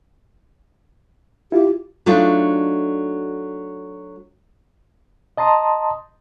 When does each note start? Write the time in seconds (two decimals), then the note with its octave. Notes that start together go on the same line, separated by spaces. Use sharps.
1.52 E4 F4 G4
2.06 F#3 A3 D4 D#4 F4
5.37 D#5 A5 A#5 C6 D#6